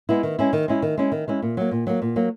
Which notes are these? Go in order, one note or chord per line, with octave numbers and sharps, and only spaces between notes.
G#3 B3 E4
D#3
G#3 C#4 E4
D#3
G#3 C#4 E4
D#3
G#3 C#4 E4
D#3
G#3 C#4 E4
A#2
F#3 A#3
A#2
F#3 A#3
A#2
F#3 A#3